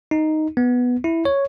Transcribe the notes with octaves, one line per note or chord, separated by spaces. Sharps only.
D#4
B3
E4
C#5